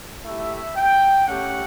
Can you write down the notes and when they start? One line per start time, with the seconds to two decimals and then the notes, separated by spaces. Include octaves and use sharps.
0.24 A3 E4 G4 E5
0.76 G5
1.28 A3 C#4 G4 F#5